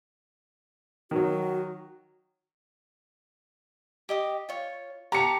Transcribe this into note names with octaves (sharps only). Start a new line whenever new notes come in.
D#3 F#3 F#4
G4 D#5 D#6
F4 C#5
G4 A5 A#5 C#6 C#7